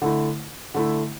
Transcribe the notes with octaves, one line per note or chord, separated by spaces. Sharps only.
D3 A3 E4
D3 A3 E4